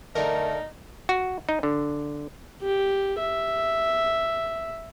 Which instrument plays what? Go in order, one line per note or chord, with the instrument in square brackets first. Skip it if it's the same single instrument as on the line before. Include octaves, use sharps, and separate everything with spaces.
[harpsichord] D3 [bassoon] A3 [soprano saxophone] D#4 [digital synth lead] A#4
[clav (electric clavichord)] F#4
D#4
D3
[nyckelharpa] G4
E5